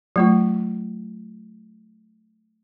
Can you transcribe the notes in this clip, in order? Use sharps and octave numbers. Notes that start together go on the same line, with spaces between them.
F#3 A3 F4